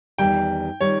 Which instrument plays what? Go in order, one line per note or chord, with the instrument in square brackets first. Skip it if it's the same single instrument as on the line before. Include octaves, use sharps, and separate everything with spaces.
[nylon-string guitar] E2 D#3 G3 [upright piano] G5
[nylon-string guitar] D#3 G3 [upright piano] C#5